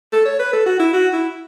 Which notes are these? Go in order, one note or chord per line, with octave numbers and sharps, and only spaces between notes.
A4
C#5
B4
A4
F#4
E4
F#4
E4